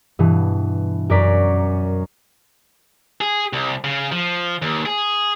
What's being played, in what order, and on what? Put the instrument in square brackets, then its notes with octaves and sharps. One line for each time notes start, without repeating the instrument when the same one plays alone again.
[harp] G2 B2 E3
F#2 A#4 C#5 D5 B6
[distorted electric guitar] G#4
C2
C#3
F3
D#2
G#4